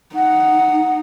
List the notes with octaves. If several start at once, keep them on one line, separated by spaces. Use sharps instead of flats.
D#4 F#5